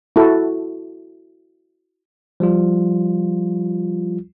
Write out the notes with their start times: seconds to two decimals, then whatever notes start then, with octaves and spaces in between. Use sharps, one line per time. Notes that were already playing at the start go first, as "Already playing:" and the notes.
0.16 E4 F#4 A4
2.40 F3 G3 F4